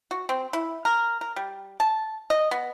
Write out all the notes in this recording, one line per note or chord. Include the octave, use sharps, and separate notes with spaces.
F#4
C4
E4
A#4
A#4
G3
A5
D#5
B3